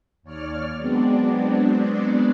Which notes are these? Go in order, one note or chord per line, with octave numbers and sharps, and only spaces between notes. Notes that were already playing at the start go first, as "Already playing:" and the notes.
D#2 C#5 D5 F6
F#3 G#3 B3 C4 D4 D5